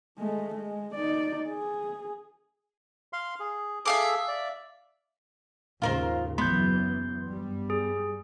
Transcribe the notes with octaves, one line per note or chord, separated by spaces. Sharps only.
G#3 A3
G#3
D#4 D5
G#4
F5 C6
G#4
G#4 A4 E5 F5 D6
D5
D#2 G#2 C#3 F4 A#4 C5
F#1 E3 F#3 B3 C6 G6
G2 G3
G#4